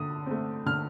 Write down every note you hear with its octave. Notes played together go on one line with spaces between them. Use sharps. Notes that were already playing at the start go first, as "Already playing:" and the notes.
Already playing: D3 D#6
A3 C4
D3 F6